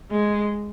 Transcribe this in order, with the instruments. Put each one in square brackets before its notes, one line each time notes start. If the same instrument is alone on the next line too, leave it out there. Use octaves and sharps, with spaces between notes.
[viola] G#3